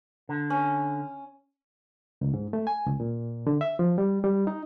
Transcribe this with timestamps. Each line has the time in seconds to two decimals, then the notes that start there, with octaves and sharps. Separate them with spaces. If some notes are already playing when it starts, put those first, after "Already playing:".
0.29 D3
0.50 C#4
2.21 C#2
2.34 G#2
2.53 A3
2.67 G#5
2.86 C#2
3.00 A#2
3.47 D3
3.61 E5
3.79 F3
3.98 G3
4.24 G3
4.47 D#4